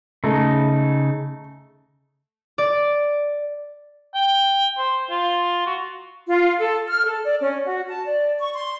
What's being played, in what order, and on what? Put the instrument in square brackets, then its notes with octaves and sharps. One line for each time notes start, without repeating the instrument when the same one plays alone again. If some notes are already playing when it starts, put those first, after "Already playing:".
[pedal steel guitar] C#3 D#4 [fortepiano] A3
[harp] D5
[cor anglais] G5
C5
F4
F#4
[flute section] F4
A4
F6
A4
D5
C#4
F#4
A5
D5
C#6
C6